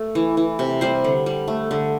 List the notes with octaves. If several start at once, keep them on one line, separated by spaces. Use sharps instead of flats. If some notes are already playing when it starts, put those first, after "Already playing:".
Already playing: A3
E3
E3
C3
G3 C5
D3
G3
A3
D3